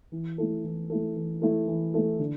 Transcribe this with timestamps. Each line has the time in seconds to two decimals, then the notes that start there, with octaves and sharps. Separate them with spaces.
0.12 E3
0.38 A3 E4 A4
0.64 E3
0.90 A3 E4 A4
1.16 E3
1.42 A3 E4 A4
1.68 E3
1.94 A3 E4 A4
2.19 D3